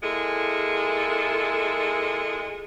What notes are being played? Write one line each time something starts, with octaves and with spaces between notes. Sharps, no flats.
G#3 A#3 E4 F4 G#4 A4